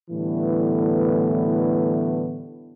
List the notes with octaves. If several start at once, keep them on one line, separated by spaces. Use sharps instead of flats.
A2 D3 E3 G3 A3 B3